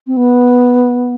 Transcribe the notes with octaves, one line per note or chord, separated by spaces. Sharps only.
C4
B3